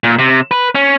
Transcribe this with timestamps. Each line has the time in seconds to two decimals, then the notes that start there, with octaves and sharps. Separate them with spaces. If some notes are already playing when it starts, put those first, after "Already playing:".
0.04 A#2
0.19 C3
0.51 B4
0.75 C#4